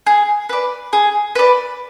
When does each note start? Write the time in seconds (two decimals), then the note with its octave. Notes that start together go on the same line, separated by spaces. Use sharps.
0.06 G#4
0.49 B4 D5
0.93 G#4
1.35 B4 D5